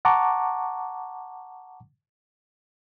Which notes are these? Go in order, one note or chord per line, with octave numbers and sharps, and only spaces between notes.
F#5 A5 A#5 C#6 D6